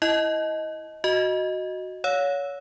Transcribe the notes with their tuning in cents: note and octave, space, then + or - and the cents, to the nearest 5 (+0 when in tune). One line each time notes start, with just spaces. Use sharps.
E4 +0 D#5 +10
F#4 -5 D#5 +0
C#5 +25 F5 +40 E6 +0